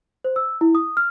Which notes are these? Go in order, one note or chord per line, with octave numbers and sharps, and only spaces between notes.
C5
E6
E4
D#6
F6